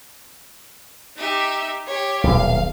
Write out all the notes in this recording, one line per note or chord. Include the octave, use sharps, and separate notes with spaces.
D#4 G4 E5
G4 C#5
D#1 B1 F5